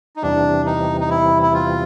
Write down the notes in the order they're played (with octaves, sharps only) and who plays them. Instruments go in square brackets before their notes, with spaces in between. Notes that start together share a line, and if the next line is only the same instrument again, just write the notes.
[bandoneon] D#4
[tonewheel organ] E2 C3 E3 G3 [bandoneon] D4
[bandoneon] D#4
D#4
E4
E4
F4